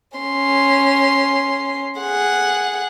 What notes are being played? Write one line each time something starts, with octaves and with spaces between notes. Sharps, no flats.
C#4 C6
G#4 F#5